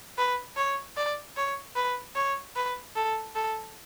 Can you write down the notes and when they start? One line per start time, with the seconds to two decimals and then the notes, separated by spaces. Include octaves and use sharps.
0.18 B4
0.57 C#5
0.97 D5
1.37 C#5
1.76 B4
2.15 C#5
2.56 B4
2.96 A4
3.35 A4